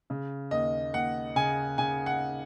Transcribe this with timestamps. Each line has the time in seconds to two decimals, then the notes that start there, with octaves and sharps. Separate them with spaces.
0.10 C#3
0.51 D#2 D#5
0.94 D#2 F#5
1.36 C#3 G#5
1.78 C#3 G#5
2.06 F#5